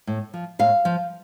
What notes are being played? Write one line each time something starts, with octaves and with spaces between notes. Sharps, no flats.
A2
F3
A2 F5
F3